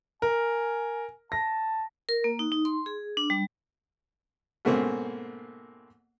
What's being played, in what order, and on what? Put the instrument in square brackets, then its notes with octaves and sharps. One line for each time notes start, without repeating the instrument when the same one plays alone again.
[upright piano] A#4 [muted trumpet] G#5
[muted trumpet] A5 [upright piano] A#6
[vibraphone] A#4
A#3
D#4
D#4
C6
G#4
D4
G3
[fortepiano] G#2 B2 A3 A#3 C4 C#4